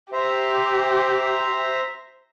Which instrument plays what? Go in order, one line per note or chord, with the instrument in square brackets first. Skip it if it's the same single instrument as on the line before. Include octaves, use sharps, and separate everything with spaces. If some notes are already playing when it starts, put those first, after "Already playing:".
[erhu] G4 [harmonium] C5 E5 A#5